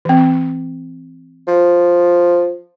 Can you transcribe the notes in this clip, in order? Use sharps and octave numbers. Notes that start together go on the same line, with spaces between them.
E3 C4
F3